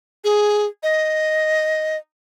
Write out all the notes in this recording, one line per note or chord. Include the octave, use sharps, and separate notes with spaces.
G#4
D#5